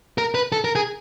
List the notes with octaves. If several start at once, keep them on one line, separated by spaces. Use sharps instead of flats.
A#4
B4
A4
A#4
G#4